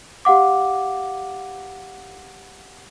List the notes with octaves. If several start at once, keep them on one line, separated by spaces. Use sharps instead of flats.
G4 F5 F#5 D6